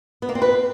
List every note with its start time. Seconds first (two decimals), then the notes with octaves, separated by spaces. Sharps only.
0.22 B3
0.29 A#3
0.35 C4
0.42 B4